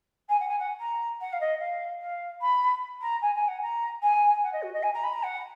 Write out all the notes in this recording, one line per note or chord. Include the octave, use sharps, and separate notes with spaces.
G#5
F#5
G#5
F#5
A#5
F#5
F5
D#5
F5
F5
B5
A#5
G#5
G#5
F#5
A#5
G#5
F#5
D#5
F#4
D#5
G#5
A#5
B5
A#5
F#5